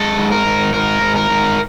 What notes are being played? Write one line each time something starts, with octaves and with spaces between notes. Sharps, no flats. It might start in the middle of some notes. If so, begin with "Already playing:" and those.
Already playing: G#3 A4
G#2
A#4
G#2
G#2 A#4
G#2
A#4
G#2